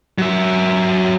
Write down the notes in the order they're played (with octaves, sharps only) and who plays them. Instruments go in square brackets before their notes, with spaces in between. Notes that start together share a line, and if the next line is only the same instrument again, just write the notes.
[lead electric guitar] F#3 E5